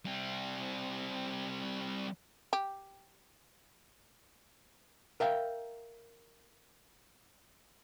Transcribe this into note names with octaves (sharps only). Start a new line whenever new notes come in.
G3 C4
G4
A#4 E5 F5 G5